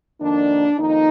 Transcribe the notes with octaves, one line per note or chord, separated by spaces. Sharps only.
F2 D#3 A#3 D4
F2 D#3 A#3 D#4